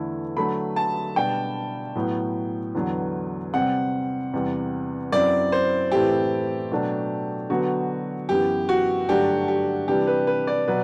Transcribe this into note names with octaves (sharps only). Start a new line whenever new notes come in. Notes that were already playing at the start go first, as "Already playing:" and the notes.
Already playing: E2 D3 A3 E4
D3 F#3 A3 B5
A5
B2 G3 D4 G5
A2 F#3 B3
E2 D3 F#3 B3
C3 G3 C4 F#5
E2 C3 G3
F#2 F#3 C4 E4 D5
C5
A2 E3 A3 C4 E4 G4
B2 F#3 A3 D4
D3 F#3 B3 F#4
F#2 E3 B3 E4 G4
F#4
G2 D3 F#3 A3 D4 G4
G4
C3 E3 G3 D4 G4
B4
B4
D5
B2 F#3 B4